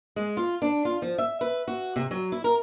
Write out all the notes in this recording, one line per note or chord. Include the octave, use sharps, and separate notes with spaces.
G#3
F4
D4
F4
F3
E5
B4
F#4
C3
F#3
E4
A#4